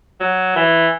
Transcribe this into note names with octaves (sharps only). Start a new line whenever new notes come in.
F#3
E3